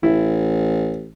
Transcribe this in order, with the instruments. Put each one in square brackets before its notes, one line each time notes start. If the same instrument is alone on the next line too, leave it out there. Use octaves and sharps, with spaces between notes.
[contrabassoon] A1 [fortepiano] E4